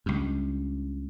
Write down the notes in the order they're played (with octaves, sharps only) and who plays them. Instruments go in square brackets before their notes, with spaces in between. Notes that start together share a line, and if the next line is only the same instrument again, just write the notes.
[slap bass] C#2 G2